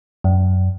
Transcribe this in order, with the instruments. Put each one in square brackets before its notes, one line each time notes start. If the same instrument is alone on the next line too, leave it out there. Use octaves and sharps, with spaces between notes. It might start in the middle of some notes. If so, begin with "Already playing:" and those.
[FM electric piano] F#2